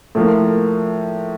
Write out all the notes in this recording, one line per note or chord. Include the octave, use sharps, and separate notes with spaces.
A2 F3 A#3